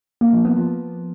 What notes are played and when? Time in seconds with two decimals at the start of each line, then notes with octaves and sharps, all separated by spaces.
0.21 A#3
0.33 F3
0.45 B3
0.57 F3